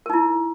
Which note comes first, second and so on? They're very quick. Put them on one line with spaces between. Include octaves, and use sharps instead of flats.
A#4 D#4 E4